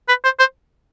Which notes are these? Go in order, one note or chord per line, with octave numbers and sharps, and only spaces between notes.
B4
C5
C5